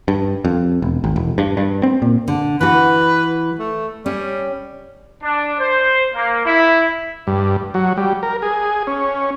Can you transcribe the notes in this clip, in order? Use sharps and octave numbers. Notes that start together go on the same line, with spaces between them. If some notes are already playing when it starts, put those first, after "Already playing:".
G2
F2
E1
G#1
E1
G2
G2
C4
A#2
D3
E3 F#4 B4
A3
G3 C#4
D4
C5
A#3
E4
G2
F#3
G3
A#4
G#4
C#4